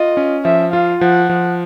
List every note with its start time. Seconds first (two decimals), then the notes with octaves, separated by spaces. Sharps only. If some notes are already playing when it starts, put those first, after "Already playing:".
Already playing: F4 D#5
0.17 C#4
0.44 F3 E5
0.73 F4 F5
1.01 F3 F#5
1.29 F3